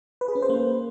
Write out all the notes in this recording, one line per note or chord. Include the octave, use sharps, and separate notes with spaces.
B4
G#4
C#4
C5
A#3